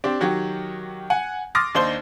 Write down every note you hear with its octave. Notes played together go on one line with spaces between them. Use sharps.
C4 D4 G4
D#3 F#3 F#4 G4
F#5 G#5
C6 D6 D#6 F6 A6 A#6
D#2 D4 D#4 C5 C6 G7